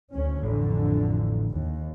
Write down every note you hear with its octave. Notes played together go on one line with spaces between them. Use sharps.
D2 C#4
A1 F2 D3
D#2